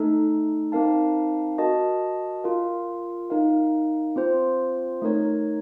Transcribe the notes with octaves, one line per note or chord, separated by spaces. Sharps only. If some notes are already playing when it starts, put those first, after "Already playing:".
Already playing: A3 D#4 A4
C4 D#4 A#4 F5 A5
F#4 A#4 D#5 A5
F4 A#4 F5
D#4 A#4 F5
C4 F4 C5
A3 D#4 A#4 C#5